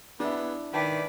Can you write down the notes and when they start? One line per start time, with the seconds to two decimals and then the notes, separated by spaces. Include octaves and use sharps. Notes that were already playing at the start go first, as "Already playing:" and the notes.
0.20 B3 D4 E4 G#4
0.73 D#3 B4 D5 E5 G5 A5